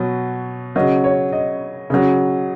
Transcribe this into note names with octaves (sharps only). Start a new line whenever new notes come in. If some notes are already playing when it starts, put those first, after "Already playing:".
Already playing: B2 F#3
C#3 F#3 D#5
C#5
D#5
C#3 F#3